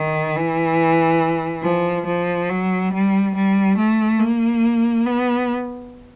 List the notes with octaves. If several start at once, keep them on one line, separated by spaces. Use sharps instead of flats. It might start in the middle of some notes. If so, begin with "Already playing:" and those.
Already playing: D#3
E3
F3
F3
F#3
G3
G3
A3
A#3
B3